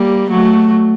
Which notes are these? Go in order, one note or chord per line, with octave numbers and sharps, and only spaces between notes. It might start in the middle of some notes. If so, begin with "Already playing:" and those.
Already playing: G3 A#3
F#3 A3